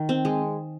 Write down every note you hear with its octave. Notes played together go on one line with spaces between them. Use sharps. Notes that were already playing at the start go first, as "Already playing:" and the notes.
Already playing: D#3
C4
G#3